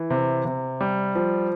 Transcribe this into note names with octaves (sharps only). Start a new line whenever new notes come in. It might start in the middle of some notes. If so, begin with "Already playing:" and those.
Already playing: E3
C3
C3
G3
F3